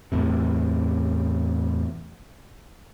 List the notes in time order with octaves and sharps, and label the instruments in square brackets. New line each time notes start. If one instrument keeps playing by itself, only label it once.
[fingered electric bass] E2 A2 C3